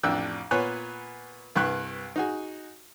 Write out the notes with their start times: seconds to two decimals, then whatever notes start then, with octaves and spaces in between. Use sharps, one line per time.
0.03 A1 F2 D4 G5 E6 F#6
0.51 A#2 B3 C#5 G#5 F#6
1.55 C2 G2 B4 G5 C#6 F#6
2.16 D#4 F#4 G#4